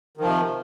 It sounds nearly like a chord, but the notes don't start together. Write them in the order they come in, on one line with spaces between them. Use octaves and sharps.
D#3 F3 C3